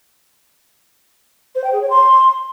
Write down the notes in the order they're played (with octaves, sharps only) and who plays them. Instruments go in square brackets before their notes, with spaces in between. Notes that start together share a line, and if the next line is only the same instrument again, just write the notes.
[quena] C5
G5
G#4
C#5
C6